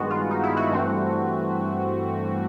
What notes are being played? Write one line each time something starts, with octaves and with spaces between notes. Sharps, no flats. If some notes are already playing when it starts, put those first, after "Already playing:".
Already playing: G2 D#3 G#3 B3 F#4
F4
D#4
E4
F#4
G2 E3 A3 C4